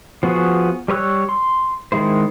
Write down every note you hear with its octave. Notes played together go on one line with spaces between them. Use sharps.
F3 B3 F#4 G#4
G3 B4 C#5 E6 F#6
C6
D#3 G#3 E4 C5